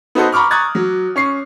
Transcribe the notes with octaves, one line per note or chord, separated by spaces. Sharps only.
B3 D#4 F#4 A4 C5 D#5
A#5 B5 C#6 D6 F6
A#5 C#6 D#6 F#6 G#6 A6
F#3
C#4 C#6 C7